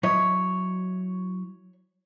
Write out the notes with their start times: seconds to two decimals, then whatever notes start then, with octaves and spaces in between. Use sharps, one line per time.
0.03 F#3 E4 C#5 D#5